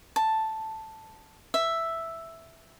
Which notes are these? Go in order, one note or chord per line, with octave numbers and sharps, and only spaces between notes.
A5
E5